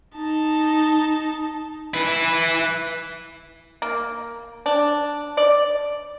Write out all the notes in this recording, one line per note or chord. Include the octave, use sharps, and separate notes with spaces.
D#4 A5
E4 B4
A#3
D4
D5